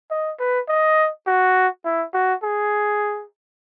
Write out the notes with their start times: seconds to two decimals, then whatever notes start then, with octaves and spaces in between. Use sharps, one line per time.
0.11 D#5
0.39 B4
0.68 D#5
1.27 F#4
1.84 E4
2.14 F#4
2.43 G#4